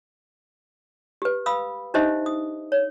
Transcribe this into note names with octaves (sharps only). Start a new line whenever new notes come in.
G4 B4
F5 B5 D#6 E6
D4 D#4 G4 C5 D#5 E5
D#6
C#5